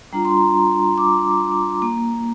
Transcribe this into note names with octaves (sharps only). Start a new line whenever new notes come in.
G3 D4 F4 A#5
C6
A#5
D6
A#3